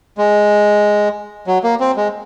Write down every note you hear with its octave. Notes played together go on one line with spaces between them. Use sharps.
G#3
F#3
A#3
C4
G#3